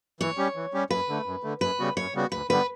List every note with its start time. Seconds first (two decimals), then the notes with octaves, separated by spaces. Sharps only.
0.20 E3 C#5
0.38 G3 C#4 G4
0.56 E3
0.74 G3 C#4 G4
0.90 F#2 B4
1.09 D3 A3
1.26 F#2
1.43 D3 A3
1.61 F#2 B4
1.79 C#3 G3 B3 F#4
1.97 F#2 C#5
2.14 C#3 G3 B3 F#4
2.32 D2 B4
2.50 D3 G3 B3 B4